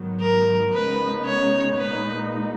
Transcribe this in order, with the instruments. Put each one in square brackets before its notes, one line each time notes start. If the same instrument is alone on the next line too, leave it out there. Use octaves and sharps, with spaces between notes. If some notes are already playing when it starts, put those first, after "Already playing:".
Already playing: [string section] G#2 D#3 F#3 B3
[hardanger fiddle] A#4
[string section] C#3 G#3 B3 D#4 [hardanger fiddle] B4
[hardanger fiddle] C#5
[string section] A#2 G#3 D#4 [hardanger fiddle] B4